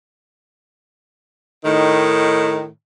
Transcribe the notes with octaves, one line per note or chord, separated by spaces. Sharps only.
A2 D#3